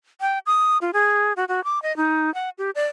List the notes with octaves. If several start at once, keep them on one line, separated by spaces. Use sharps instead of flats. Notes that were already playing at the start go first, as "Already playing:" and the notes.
G5
D#6
F4
G#4
F#4
F#4
D6
D#5
D#4
F#5
G4
D5